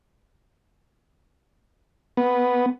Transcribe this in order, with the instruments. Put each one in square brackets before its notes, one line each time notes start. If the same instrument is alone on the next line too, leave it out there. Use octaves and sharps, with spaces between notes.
[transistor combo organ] B3